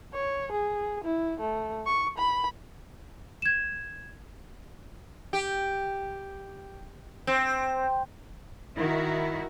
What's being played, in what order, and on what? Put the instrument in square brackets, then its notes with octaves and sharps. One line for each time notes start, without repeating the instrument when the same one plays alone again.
[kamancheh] C#5
G#4
E4
A3
C#6
B5
[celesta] G#6 E7
[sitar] G4
C4
[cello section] D#3 E4 F#4